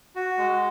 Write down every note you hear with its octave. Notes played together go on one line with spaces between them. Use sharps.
F#4
G#3